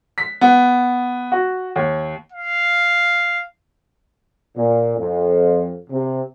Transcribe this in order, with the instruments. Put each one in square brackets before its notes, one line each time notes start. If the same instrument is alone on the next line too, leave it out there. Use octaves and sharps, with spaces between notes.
[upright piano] B6
B3
F#4
D#2
[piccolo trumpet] F5
[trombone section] A#2
F2
C3